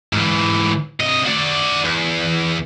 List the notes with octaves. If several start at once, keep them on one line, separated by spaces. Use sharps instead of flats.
G#2 E3
C2 D#5
F#4 D5
E2